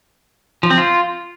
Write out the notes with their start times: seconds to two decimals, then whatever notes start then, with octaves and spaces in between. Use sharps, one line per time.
0.63 F3
0.70 C4
0.78 F4